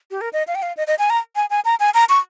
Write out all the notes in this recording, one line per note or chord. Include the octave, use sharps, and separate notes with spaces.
G4
A#4
D#5
F5
G5
F5
D#5
D#5
G#5
A#5
G#5
G#5
A#5
G#5
A#5
C#6